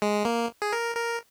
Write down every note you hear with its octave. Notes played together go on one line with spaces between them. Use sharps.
G#3
A#3
G#4
A#4
A#4